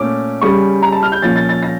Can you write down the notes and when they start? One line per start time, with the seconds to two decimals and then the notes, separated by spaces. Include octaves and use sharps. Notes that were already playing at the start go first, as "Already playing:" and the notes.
Already playing: A#2 A3 C#4 D6
0.41 C#3 G3 C#4 C#6
0.82 A#5
0.92 A5
1.03 F6
1.12 G6
1.22 A#2 F3 C#4 A6
1.36 A6
1.49 A6
1.63 A#6